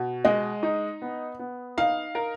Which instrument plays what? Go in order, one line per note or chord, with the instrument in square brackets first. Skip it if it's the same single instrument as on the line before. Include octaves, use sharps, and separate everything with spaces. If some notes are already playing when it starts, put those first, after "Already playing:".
Already playing: [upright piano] B2
[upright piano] G#3 [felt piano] D#5
[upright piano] D#4
B3
B3
[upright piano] D#4 [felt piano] F5
[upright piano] A#4